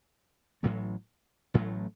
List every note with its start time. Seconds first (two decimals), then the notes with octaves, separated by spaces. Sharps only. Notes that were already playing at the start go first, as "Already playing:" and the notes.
0.63 A1 A2 F#3 A3
1.54 A1 A2 F#3 A3